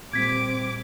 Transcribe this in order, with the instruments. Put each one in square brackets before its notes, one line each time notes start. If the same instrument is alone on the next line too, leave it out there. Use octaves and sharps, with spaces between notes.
[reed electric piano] A#2 G3 [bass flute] C4 [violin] D6 [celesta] G#6 B6